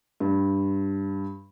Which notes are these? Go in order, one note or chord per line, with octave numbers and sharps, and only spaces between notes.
G2